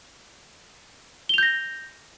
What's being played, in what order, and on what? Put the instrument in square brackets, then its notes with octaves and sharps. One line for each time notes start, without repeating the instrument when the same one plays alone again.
[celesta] G7
F7
G6
A#6